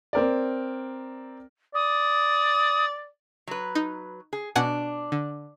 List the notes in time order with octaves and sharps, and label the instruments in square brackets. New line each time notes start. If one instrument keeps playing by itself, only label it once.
[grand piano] C4 A#4 D5
[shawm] D5 [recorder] D#6
[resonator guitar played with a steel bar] F#3 B4
[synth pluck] D#4
[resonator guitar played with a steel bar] G#4
[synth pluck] B2 F#5 G#5 [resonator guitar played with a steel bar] D4
[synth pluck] D3